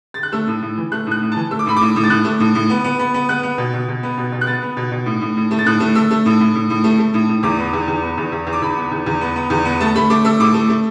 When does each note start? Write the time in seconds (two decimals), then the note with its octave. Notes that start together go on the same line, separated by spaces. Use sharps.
0.14 A6
0.23 F#6
0.32 A3 E6
0.47 A2
0.62 A2
0.78 E3
0.92 A3 F#6
1.07 A2 F#6
1.22 A2
1.32 E3 A5
1.51 A3 E6
1.59 D6
1.66 A2 B5
1.77 A2 D6
1.96 A2
2.04 A6
2.10 A2 F#6
2.25 A3
2.40 A2
2.55 A2
2.70 B3
2.84 B3
2.99 B3
3.14 B3
3.29 B3 F#6
3.43 B3
3.58 B2
3.74 B2
3.88 B2
4.03 B3
4.18 B2
4.32 B2
4.41 F#6
4.47 B3 A6
4.62 B3
4.77 B2
4.92 B2
5.06 A2
5.21 A2
5.37 A2
5.51 A3
5.59 A6
5.66 A2 F#6
5.80 A3
5.95 A3 E6
6.11 A3
6.26 A2
6.40 A2
6.55 A2
6.70 A2
6.84 A3
6.99 A3
7.14 A2
7.29 A2
7.43 E2 D6
7.58 B3
7.73 E2
7.88 E2
8.02 B3
8.18 E2
8.32 E2
8.47 E2
8.53 D6
8.62 E2 B5
8.77 B3
8.92 E2
9.06 E2
9.21 B3
9.36 B3
9.50 E2
9.65 B3
9.80 A3 A5
9.96 A3 B5
10.10 A3 D6
10.25 A3 E6
10.40 A2 D6
10.54 A3
10.69 A3